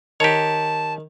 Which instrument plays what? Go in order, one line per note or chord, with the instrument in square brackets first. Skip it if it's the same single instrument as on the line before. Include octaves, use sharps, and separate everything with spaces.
[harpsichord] D#3 [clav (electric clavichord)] G4 C#5 [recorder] A5